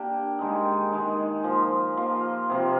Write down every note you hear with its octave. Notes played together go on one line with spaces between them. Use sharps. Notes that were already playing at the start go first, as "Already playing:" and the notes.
Already playing: A#3 D4 G4
D#3 G#3 D#4
D#3 G#3 D#4
F3 A#3 F4
F3 A#3 F4
C3 F3 A#3 F4